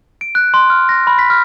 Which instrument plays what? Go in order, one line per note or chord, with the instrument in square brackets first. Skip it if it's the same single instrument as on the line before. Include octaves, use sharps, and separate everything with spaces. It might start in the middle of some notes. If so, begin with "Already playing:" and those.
[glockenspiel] D7
F#6
C6
F6
A#6
B5
B6
F6